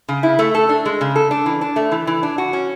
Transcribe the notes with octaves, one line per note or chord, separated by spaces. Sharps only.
C#3
E4
A3
A4
D4
G#3
C#3
A4
D4
E3
D4
A3
E3
E3
D4
F#4
C#4